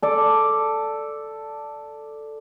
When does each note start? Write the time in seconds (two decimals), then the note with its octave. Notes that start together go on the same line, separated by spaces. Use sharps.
0.02 A4 D5